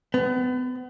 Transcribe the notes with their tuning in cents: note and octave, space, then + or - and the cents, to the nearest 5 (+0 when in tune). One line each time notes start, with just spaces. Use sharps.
B3 +35